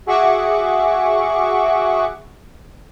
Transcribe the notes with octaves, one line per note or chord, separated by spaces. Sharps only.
F#4 G#4 E5 F#5 C#6 D6